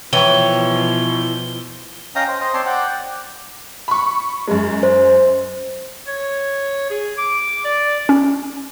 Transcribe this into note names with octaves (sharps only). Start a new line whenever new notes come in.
B2 E3 F3 C#5 G5 C#6 G7
C#4 D#5 F5 G5 A#5 D#6
C5
C5 D#5
C4 C#5 D5 A5 C6
D5 F#5 G5
D5
B5 C#6
F#2 G#3
C5
C#5
G#4
D6
D5
C#4